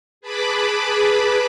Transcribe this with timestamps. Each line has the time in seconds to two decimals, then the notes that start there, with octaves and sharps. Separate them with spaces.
0.21 G#4 B4 A5 B5 D6